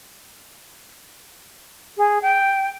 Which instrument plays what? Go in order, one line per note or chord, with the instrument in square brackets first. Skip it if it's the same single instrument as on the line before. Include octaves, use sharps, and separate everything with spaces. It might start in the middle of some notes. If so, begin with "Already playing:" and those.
[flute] G#4
G5